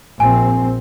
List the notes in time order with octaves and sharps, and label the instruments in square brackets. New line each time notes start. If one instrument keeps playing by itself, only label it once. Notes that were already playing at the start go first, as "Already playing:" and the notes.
[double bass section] A#1 C4 [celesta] G#5